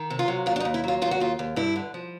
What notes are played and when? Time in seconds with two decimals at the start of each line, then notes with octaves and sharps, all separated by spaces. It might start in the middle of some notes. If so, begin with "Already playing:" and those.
Already playing: D#3
0.10 C3
0.19 F4
0.28 F#3
0.46 D#2 F4
0.56 D4
0.60 D#4
0.65 D#2
0.74 E4
0.84 F#3 F4
1.02 D#2 F4
1.11 F#4
1.20 D#2 F4
1.39 D#2
1.56 G2 E4
1.76 D3
1.94 F3